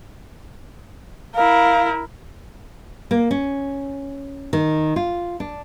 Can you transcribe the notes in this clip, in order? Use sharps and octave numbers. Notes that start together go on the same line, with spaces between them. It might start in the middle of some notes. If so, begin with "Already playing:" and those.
E4 A#4 F5
A#3
C#4
D#3
F4
D4